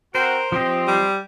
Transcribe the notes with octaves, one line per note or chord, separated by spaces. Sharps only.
C4 F#4 A#4 C5
F3 C4 G4 D#5
G3